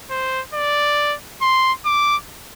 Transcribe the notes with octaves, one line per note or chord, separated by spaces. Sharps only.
C5
D5
C6
D6